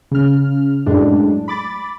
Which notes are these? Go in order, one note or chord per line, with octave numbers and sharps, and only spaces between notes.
C#3 F6
F#2 A2 G#3 D4
B5 D6 A6